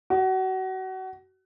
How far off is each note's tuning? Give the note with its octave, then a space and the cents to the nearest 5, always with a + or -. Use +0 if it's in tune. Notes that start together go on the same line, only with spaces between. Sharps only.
F#4 +30